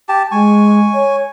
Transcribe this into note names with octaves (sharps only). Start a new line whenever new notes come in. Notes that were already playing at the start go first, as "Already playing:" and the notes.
G4 A5
G#3 G#5 C#6
C#5